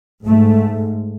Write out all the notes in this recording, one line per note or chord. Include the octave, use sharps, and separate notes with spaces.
G#2 A3